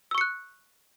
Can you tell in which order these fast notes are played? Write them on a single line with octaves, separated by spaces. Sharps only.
E6 C#6 C#7 F#6